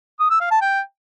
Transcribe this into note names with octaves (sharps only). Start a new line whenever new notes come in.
D#6
E6
F5
A5
G5